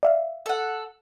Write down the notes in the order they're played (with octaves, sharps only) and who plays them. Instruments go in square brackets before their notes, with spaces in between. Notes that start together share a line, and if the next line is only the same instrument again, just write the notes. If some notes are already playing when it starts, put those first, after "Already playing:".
[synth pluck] D5 E5 F5
[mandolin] A4 F#5